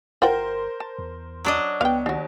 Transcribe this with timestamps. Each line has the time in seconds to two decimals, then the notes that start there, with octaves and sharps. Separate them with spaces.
0.22 G1 F4 A#4 C5 F#5 G5
0.80 A5
0.99 E2
1.45 F#3 D4 D#5
1.81 C#2 B3 F5 G5
2.06 D#2 D4 F#4